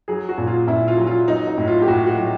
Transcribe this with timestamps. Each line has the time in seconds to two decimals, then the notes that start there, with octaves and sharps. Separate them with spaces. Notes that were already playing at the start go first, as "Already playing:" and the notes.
0.08 F#3 G#4
0.29 F#4
0.38 A#2
0.47 F4
0.67 A#2 E4
0.88 F4
0.97 F#3
1.07 F4
1.28 F#3 D#4
1.47 D#4
1.58 A2
1.68 F4
1.82 G4
1.88 A2 F#4
2.07 F#4
2.18 F#3